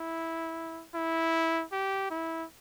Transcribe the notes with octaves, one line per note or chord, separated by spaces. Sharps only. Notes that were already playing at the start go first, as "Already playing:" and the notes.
Already playing: E4
E4
G4
E4